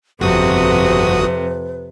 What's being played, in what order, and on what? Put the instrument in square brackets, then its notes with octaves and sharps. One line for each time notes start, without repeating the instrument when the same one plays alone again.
[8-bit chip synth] G1 F#4 D#6 [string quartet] F2 C3 [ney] B4